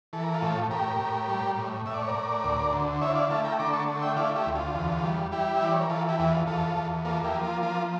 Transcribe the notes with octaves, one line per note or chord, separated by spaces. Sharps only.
E3 A4
A#4
F4 A4
A2
A2 G4 A#4
A2
G3
A2
A2 E5
D5
C#5
A#4 D5
A2
D2
D3
E4 C#5 E5
D5 F5
A3 F5 A5
G5 A#5
D3 A#5 D6
A5 C#6
A3
E5 G5
E4 D5 F5
E4 G4
D2
F4
E2
G3
G3 E4 G4
E5
E3 D5
C#5
A#4
E3 F4 A4
E4 G4
E2 E4
F4
E2 F4 A4
E2
A#3 F4 A4
E4 G4
F3
F4
F3 F4